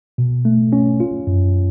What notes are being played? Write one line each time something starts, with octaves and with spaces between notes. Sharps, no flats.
B2
A3
C#4
F4
F#2